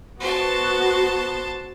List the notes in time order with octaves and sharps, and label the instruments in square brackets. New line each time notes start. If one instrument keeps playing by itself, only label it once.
[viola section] B3 F#4 [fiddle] C5 A5